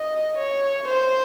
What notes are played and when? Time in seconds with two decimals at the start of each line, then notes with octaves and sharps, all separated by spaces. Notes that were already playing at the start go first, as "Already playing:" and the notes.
Already playing: D#5
0.38 C#5
0.88 C5